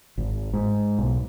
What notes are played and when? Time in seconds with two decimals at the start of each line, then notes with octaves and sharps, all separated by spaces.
0.18 G#1
0.54 G#2
0.99 B1